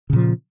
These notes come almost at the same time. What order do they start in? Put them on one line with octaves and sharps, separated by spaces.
C#3 A#2 F3